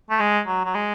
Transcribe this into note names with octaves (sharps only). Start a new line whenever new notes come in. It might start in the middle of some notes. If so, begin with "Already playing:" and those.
A3
G#3
F#3
F#3
G#3